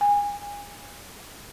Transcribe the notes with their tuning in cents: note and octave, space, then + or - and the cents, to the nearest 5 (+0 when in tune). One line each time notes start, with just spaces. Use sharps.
G#5 -25